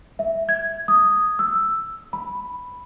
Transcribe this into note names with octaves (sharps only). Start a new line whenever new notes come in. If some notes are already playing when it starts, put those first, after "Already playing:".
E5
G#6
D#6
E6
B5